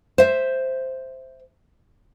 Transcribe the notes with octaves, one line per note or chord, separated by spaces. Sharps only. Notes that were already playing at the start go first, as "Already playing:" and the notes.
C5 E5